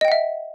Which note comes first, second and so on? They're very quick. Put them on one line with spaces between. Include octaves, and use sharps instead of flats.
D#5 G5 F#5 E5